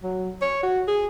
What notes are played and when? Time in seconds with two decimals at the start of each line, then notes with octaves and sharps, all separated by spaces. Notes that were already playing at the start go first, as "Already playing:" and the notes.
0.03 F#3
0.42 C#5
0.63 F#4
0.88 G#4